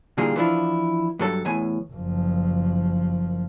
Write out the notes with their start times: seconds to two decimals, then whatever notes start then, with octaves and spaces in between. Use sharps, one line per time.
0.18 A#2 D3 E3 G3 F4 G#4
0.36 E3 F3 D4 E4 F4
1.19 G2 F#3 A4
1.45 E2 A2 G#5
1.93 F#1 F3